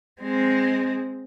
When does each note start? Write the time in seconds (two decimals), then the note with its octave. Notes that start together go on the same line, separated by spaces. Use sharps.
0.22 G#3 C4